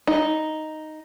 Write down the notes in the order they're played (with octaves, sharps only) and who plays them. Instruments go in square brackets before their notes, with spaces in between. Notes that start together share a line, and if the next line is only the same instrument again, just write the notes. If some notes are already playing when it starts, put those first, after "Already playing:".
[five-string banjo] D#4